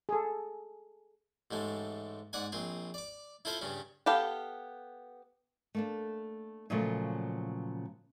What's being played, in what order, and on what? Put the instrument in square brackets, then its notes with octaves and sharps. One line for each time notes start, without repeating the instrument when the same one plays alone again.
[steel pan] G#4 A4
[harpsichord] A1 G#2 G#3 A3
G#2 D5 F#5 G#5
A#1 C4 G#4
D5 D6
E4 F4 A4 C5 E5 F5
G2 C#3 C#4
[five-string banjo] B3 G4 A4 F5
[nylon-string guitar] A3 A#3 D4
A#2 C#3 F3 F#3 A3